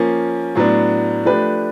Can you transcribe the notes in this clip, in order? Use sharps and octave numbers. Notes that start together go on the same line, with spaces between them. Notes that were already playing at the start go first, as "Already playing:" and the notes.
Already playing: F3 A#3 C#4
A2 F#3 B3 D4
F3 A3 D4 G4 B4